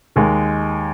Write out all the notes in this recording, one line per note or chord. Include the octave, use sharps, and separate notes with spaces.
D#2 D#3 G#3